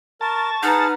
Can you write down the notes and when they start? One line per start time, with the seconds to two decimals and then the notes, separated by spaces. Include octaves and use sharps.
0.21 A#4 A5 C#6
0.63 D#4 G#4 B4 F#5 A#5 F6